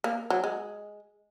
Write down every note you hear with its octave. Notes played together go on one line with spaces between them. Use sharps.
A#3
F#3
G#3